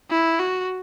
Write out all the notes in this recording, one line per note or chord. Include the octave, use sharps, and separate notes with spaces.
E4
F#4